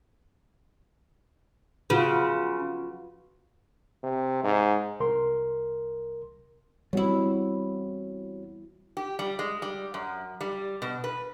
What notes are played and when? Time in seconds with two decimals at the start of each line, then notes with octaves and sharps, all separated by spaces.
1.90 C#3 F4 F#4 B4
4.03 C3
4.44 G#2
5.00 C2 A#4 C6
6.93 E2 G3 A3 C4 E4 F#4 C#5
8.97 G4
9.19 G3
9.39 G#3
9.62 G3
9.94 F#2
10.41 G3
10.82 B2
11.04 B4